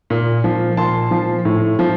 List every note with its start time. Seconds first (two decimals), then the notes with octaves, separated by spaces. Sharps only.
0.10 A#2
0.44 F3
0.77 A#2 A5 C6
1.11 F3
1.45 A2
1.79 F3